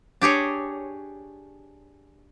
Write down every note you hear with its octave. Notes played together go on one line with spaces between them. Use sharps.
D4 G4 G#4 C#5